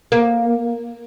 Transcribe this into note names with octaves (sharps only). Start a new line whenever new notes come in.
A#3